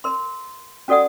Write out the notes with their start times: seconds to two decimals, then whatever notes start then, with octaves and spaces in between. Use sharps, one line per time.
0.04 A#4 C6
0.88 C#4 F#4 A4 D5 F#5 D#6